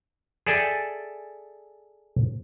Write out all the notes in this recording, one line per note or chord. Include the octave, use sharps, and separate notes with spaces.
G#4 A4 D5 E5 G5 G#5